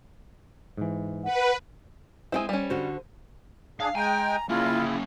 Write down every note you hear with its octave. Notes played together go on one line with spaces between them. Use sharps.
G#2 E3
B4 F#5
G#3 C4 E4 C5 G5 G#5
G3 C#4
D3 F#4 C5
D4 G#4 F5
G#3 G5 G#5 A#5
C#3 A#3 C#4 E4 F4